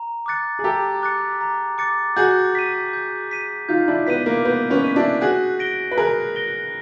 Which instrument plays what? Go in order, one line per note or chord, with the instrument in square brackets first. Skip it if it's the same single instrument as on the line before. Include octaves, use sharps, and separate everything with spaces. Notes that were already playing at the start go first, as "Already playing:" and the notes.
Already playing: [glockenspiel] A#5
D6 F#6 A6 C#7
[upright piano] G#4
[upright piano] G4 A4 [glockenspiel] A#5
[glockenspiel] D6 F#6 A6 C#7
A#5
D6 F#6 A6 C#7
[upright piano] F#4 G#4 [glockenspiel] G6
[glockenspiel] B6 D#7
G6
B6 D#7
[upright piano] D#4 F4 [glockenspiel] G6
[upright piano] D4 E4
[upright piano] B3 [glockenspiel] B6 D#7
[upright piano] A#3
[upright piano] B3 [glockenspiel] G6
[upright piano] B3 C#4
[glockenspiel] B6 D#7
[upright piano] D4 E4
[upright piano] F#4 G#4 [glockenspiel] F#6
[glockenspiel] A#6 D7 G7
[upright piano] B4
[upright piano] G#4 A#4 [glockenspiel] F#6
[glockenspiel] A#6 D7 G7